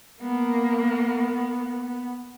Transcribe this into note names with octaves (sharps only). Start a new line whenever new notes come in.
A#3 B3